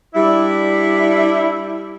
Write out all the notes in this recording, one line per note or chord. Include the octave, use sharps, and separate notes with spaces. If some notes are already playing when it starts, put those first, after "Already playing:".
G3 D4 E4